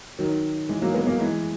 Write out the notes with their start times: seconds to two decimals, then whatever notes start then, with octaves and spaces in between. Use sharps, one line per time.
0.19 D#3 F#3
0.69 E3 G#3
0.82 F#3 A#3
0.94 G#3 B3
1.07 F#3 A#3
1.19 E3 G#3